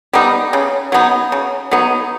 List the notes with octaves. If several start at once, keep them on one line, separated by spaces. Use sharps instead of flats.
G3 B3 D#4
C#3
F#3 B3 D#4
C#3
F#3 B3 D#4